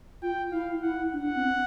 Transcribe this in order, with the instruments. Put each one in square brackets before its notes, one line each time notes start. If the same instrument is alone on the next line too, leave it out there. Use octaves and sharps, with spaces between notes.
[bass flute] F4 [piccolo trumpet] G5
[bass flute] E4 [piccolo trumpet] F5
[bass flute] E4 [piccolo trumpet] F#5
[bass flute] D4 [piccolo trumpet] F#5
[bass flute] C4